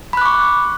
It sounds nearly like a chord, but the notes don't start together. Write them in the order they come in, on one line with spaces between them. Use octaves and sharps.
B5 F#6 D6 C#6